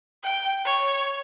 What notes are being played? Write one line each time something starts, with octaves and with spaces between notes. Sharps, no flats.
G5
C#5